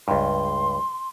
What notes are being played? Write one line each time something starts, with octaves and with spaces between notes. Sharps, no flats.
C#2 G2 C6